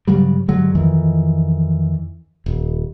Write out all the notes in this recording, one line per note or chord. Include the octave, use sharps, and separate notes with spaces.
G2 C#3 F#3 G3
G2 D3 F#3 G#3
F2 D#3 E3
D#1